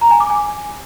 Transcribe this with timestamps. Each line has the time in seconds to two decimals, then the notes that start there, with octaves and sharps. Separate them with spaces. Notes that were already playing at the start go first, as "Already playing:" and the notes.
0.01 A#5
0.11 G#5
0.20 D6
0.30 G#5